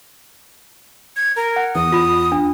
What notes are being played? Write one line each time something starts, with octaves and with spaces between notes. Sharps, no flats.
G#6
A#4
F#5
E2 D#6
F4 B5
D4